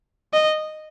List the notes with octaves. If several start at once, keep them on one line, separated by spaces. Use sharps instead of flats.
D#5